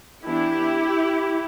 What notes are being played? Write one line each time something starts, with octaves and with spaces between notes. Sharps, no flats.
E3 B3 D4 E4 G4